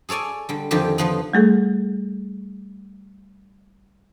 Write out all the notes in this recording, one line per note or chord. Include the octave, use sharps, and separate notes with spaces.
G#4 A4 C#5 D5 G#5
D3 G3
F2 D3 D#3 F3 G4
D3 F3 B3
G3 A3 G#4 A4